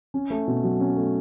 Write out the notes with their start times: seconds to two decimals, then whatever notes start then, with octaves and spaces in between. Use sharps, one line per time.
0.14 C#4
0.30 A3
0.47 B2
0.63 F#3
0.80 C#4
0.97 A3